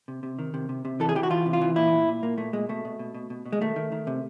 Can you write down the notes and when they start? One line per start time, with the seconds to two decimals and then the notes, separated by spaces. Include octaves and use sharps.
0.08 C3
0.23 C3
0.39 D#3
0.54 C3
0.69 C3
0.85 C3
1.00 E3 A4
1.09 G#4
1.15 E3 G4
1.23 F#4
1.30 E3 F4
1.46 C3
1.53 F4
1.61 E3
1.76 A#2 E4
1.92 A#2
2.08 A#2
2.23 A#2 A#3
2.38 A#2 A3
2.53 A#2 G#3
2.69 B2 A3
2.85 B2
2.99 B2
3.15 B2
3.30 B2
3.46 B2
3.53 G#3
3.61 D#3 A3
3.76 D#3
3.92 D#3
4.07 C3